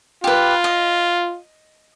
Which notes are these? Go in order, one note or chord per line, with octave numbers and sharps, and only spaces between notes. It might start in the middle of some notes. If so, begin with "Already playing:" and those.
F4 G4 B4
D#5